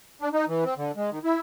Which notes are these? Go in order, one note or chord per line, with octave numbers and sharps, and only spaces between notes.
D4
D#4
E3
C4
D3
G#3
D#3
E4